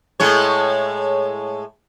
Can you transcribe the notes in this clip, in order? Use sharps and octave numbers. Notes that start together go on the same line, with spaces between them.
A2 G#3 C#5